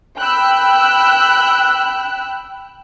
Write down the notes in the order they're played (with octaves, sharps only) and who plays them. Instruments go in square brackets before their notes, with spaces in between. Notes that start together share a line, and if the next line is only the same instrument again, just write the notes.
[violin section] G5 B5 E6 F#6